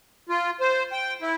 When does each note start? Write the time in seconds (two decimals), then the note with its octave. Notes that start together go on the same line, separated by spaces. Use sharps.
0.29 F4
0.61 C5
0.92 G5
1.21 E4